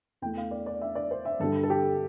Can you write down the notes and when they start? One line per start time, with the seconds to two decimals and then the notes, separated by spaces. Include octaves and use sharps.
0.22 E2 E3 A3 G5
0.37 F5
0.51 D5
0.66 D5
0.81 E5
0.95 D5
1.11 C5
1.25 E5
1.40 G2 D3 G3 A4
1.63 A4
1.70 G4